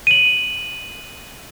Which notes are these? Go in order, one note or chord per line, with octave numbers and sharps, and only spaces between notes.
D#7 F#7